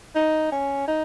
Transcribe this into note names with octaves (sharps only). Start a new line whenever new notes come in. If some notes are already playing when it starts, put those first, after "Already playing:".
D#4
C#4
D#4